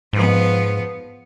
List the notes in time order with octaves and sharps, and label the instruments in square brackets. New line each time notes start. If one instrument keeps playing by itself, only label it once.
[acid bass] G#2 [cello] F3 B3